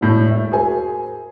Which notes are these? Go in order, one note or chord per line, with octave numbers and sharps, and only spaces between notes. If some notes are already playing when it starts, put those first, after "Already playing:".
E1 A2 G6
E5
F#4 G#4 A#4 C5 G#5